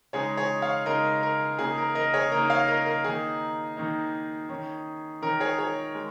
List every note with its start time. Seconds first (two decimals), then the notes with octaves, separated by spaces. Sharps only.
0.13 C#3 G#3 D#4 G#4 C#5
0.37 G#4 C#5
0.62 C#5 F5
0.86 C#3 G#3 D#4 A#4 D#5
1.23 A#4
1.59 C#3 A#3 D#4 G#4
1.78 A#4
1.95 A#4 D#5
2.14 G#4 C#5
2.31 C#3 A#3 D#4 A#4 D#5
2.50 C#5 F5
2.68 A#4 D#5
2.86 A#4
3.04 D#3 A#3 D#4 G#4
3.77 D#3 A#3 D#4
4.49 D#3 C#4
5.22 D#3 C#4 A#4
5.40 G#4 C#5
5.58 G#4 C#5
5.95 G#3